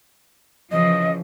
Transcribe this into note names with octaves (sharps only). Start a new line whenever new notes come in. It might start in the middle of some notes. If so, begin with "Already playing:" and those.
C#3 E3 F3 D#5